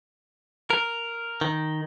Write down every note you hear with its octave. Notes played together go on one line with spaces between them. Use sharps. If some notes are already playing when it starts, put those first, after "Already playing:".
A#4
D#3